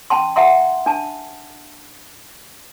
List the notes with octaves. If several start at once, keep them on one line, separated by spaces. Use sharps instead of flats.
C#4 G5 A5 C6
E5 F#5 A#5 C6
D4 A5